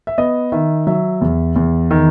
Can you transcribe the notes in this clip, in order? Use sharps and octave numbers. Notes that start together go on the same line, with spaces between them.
E5
B3 D#5
D#3 E5
F#3 E5
E2
E2
D#3